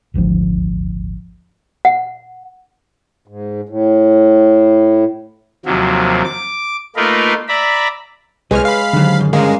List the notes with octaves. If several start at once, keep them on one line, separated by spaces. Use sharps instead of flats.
D#1 G#1 D2 F3
F#5
G#2
A2
D#2 C3 F3 F#3
D6
A3 A#3 D#4 F4 A#4 B4
D5 E5 A#5 B5
C2 G#3 B4 C#5 F6
F5 B5
D#2 D3 D#3 F#3
F#2
G2 G#3 A#3 C#4 F5